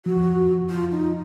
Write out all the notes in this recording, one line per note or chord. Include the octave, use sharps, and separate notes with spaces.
F3 F#4
F4
D#4